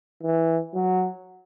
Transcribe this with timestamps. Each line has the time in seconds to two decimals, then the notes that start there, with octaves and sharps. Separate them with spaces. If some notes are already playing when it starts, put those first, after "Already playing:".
0.23 E3
0.74 F#3